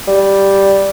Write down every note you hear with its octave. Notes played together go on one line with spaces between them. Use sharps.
G3